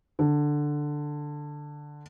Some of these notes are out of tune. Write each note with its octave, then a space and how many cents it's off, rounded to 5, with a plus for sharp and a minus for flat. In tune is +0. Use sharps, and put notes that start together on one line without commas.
D3 +5